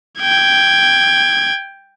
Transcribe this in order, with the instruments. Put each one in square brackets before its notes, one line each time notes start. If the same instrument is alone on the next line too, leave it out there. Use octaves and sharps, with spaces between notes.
[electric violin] G5 G#6